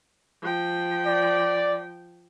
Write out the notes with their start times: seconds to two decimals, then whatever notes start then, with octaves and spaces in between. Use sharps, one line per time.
0.42 F3 G5
1.06 D5